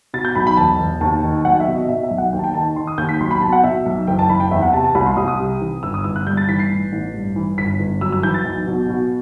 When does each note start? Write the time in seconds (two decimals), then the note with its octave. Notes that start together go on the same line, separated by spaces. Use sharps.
0.14 B2 A6
0.25 G6
0.35 B1 B5
0.47 B5
0.57 E1 A5
0.80 E1
1.01 D#2 A5
1.23 D#3
1.45 B1 F#5
1.60 E5
1.67 B2
1.75 D#5
1.89 B2 E5
2.03 E5
2.11 B1
2.18 F#5
2.33 D#2 G5
2.39 A5
2.44 G5
2.54 D#3 A5
2.76 D#3 C6
2.87 D#6
2.98 D#2 G6
3.09 B6
3.20 B1 C6
3.31 B5
3.42 B2 A5
3.53 F#5
3.64 B2 E5
3.86 B1
4.07 F#1 G5
4.19 A5
4.29 F#1 B5
4.40 G5
4.51 E2 E5
4.62 F#5
4.73 C3 A5
4.84 A5
4.95 C2 B5
5.06 C6
5.17 C2 D#6
5.28 D#6
5.39 C3
5.61 E3
5.83 G1 E6
5.94 D#6
6.04 G1 E6
6.16 F#6
6.26 G2 G6
6.37 A6
6.49 E3 B6
6.59 C7
6.70 A1
6.92 A1
7.14 G2
7.36 E3
7.58 G1 B6
7.80 G1
8.01 F#2 E6
8.12 E6
8.23 E3 G6
8.34 A6
8.45 B1
8.67 B2
8.89 B2